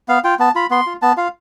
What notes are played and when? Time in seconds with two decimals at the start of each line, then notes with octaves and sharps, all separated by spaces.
0.08 B3 F5
0.24 F4 G5
0.39 B3 A5
0.55 F4 B5
0.71 B3 C6
0.87 F4
1.02 B3 A5
1.17 F4 F5